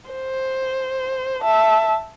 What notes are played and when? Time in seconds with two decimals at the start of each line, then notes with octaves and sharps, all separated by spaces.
0.11 C5
1.42 E5 A5